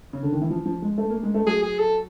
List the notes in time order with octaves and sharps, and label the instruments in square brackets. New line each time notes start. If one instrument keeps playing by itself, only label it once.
[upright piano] C#3
D3
D#3
E3
F3
F3
G#3
A3
A#3
G#3
A3
[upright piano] F#3 [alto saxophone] G#4
[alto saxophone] G#4
A4